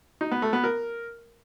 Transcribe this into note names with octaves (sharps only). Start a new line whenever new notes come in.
D#4
B3
A3
B3
A#4